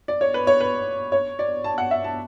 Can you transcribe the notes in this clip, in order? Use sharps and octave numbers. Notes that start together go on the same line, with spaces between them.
D5
C#5
B4
C#5
B4
C#5
D5
A5
F#5
E5
A5